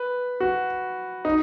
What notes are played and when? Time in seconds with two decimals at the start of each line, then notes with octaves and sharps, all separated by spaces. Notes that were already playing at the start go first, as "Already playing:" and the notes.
Already playing: B4
0.40 F#4
1.25 D#4